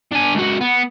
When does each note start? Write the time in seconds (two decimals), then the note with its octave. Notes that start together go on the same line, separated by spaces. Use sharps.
0.12 D4 G#5
0.35 C#2 F#4
0.61 B3